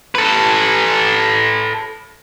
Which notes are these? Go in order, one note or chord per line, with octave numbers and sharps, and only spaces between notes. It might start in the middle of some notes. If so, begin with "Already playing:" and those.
A4 B4